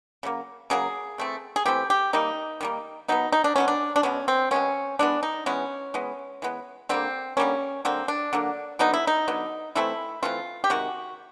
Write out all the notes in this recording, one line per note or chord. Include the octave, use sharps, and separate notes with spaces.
C#3 F#3 A#3
C#3 F#3 A#3 G#4
E3 A3 C4
G#4
E3 A3 C4 G4
G4
D#3 G3 A#3 D#4
D#3 G3 A#3
B2 F#3 B3 D#4
D#4
D4
B2 F#3 B3 C#4
D4
D4
B2 G#3 B3 C#4
C4
B2 G#3 B3 C#4
E3 G#3 B3 D4
D#4
E3 G#3 B3 C#4
E3 G#3 B3
E3 G#3 B3
D3 G3 A#3 C4
D3 G3 A#3 C#4
D3 F#3 A#3 C4
D4
D3 F#3 A#3
D3 F#3 B3 D#4
E4
D#4
D3 F#3 B3
E3 A3 C4 E4
E3 A3 C4 F4
G4
C3 D#3 G#3 F#4